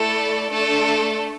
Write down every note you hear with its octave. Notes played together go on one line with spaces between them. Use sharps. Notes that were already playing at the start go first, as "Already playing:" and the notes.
Already playing: A3 E4 A4 D5
A3 D4 A4